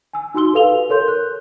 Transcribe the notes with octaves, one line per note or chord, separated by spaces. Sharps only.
G#5 E6
D#4 F#4 C6 E6 G7
G4 A4 B4 F5 F7 G7
A4 A#4 C#5 C6 G6
F#6